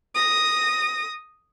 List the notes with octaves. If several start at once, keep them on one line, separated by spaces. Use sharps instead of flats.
D#6 A#6